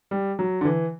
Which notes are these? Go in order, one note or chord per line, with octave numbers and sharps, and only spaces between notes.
G3
F#3
D3
E3